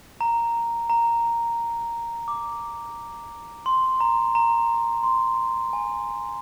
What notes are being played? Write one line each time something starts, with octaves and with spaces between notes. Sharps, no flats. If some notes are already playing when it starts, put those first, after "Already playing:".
A#5
A#5
D6
C6
A#5
A#5
C6
G#5